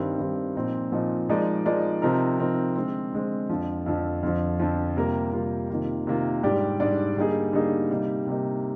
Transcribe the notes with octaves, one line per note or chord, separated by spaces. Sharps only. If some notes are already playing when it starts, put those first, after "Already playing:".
Already playing: G2 D#3 G3 C4
G2 D#3 G3 C4
A#2 F3 C4 D#4
A#2 F3 C4 D#4
F3 G#3 D#4 A#4 D5
F3 G#3 D#4 A#4 D5
C3 F3 C4 D#4 A#4
C3 F3 C4 D#4 A#4
D3 G#3 C4
D3 G#3 C4
F2 D3 F3
F2 D3 F3
F2 D3 F3
F2 D3 F3
C3 G3 A#3 F4 A#4
C3 G3 A#3 F4 A#4
C3 D#3 A#3 F4
C3 D#3 A#3 F4
G#2 G3 D4 G4 D5
G#2 G3 D4 G4 D5
D3 G3 A#3 D#4 G#4
D3 G3 A#3 D#4 G#4
C3 G3 A#3 D#4
C3 G3 A#3 D#4